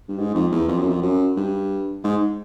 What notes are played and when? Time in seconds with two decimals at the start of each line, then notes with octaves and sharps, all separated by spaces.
0.09 G2
0.19 G#2
0.35 F2
0.52 E2
0.68 F2
0.79 F#2
0.89 F2
1.03 F#2
1.37 G2
2.04 G#2